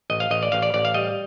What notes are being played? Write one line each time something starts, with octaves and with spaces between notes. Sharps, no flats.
A1 D#5
F5
A1 D#5
D5
A1 F5
D5
A1 D5
F5
G3 D#5